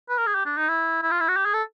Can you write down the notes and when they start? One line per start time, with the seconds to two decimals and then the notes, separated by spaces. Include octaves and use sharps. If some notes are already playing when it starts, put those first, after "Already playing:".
0.09 B4
0.18 A#4
0.27 G#4
0.35 G4
0.46 D4
0.57 D#4
0.69 E4
1.02 E4
1.11 F4
1.20 E4
1.28 F#4
1.36 G4
1.45 G#4
1.54 A4